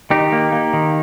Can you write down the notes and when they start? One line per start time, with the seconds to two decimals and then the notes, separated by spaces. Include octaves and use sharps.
0.10 D#3 D#4 G4
0.32 A#3
0.52 A#3
0.73 D#3